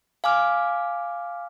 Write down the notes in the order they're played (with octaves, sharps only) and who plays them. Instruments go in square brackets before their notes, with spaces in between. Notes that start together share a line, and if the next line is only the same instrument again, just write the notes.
[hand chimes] F5 G#5 D6 F6